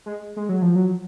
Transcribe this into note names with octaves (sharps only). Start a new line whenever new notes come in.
G#3
G#3
F#3
F3
F#3